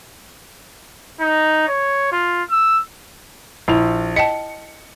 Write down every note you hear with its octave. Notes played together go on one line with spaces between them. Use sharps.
D#4
C#5
F4
E6
A#1 E4 F7
D#5 G5 A5 C#7